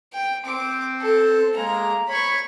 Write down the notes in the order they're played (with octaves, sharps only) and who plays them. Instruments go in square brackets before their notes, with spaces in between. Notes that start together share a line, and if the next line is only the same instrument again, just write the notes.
[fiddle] G5
[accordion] C4 [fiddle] D6
[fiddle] A4
[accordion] G#3 A#3 [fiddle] A#5
[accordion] C#5 [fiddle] B5 C#6